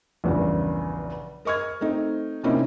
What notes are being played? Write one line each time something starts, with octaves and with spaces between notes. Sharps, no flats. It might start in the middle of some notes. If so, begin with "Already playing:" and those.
A#1 E2 G2 C#3
A#4 D#5 C#6 F6 G#6
A3 C4 D#4
C3 A#3 C4 C#4 D#4 E4